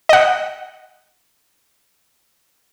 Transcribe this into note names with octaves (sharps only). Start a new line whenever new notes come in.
D#5 F#5